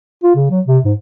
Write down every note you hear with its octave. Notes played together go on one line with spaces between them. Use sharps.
F4
C#3
F#3
C3
G#2